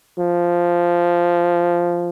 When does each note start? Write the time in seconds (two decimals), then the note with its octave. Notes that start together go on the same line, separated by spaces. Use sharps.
0.18 F3